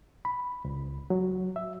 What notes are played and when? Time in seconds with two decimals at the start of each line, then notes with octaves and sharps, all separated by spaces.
0.25 B5
0.65 C#2
1.10 F#3
1.56 E5